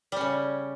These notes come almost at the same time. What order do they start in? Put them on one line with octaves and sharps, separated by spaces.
G3 C#4 C#3